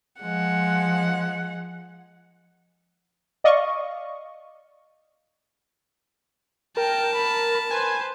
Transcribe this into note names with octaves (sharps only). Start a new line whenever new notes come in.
F3 G#3 F#5
D5 D#5 F5 C#6
A#4 G5 A5
B5
B4 C5 G#5